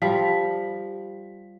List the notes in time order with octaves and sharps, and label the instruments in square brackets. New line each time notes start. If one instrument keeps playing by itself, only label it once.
[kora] F3 G3 [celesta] G4 B6